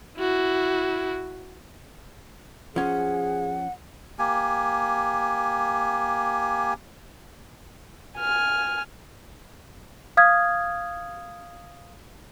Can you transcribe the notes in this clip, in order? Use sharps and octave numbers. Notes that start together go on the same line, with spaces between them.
E4 F#4
F3 C#4 G#4 F#5
A#3 G4 G#5
G#5 F6
F5 D#6 F6 G#6